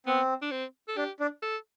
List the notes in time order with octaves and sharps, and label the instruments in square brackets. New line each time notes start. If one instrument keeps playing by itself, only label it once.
[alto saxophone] B3 [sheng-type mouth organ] C4
[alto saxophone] D4
C4
A4
[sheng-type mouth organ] D4 [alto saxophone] G4
[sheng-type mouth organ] D4
[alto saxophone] A4